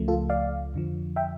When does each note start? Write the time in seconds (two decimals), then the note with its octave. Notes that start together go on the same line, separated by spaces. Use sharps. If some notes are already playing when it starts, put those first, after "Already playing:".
Already playing: C#2 C#3 F3 A3
0.08 F4 A4
0.30 D5 F5
0.74 F2 D3 F3
1.16 E5 G5